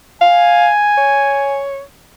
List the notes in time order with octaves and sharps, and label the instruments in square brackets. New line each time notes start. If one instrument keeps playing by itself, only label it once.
[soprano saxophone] F5 [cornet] G#5
[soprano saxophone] C#5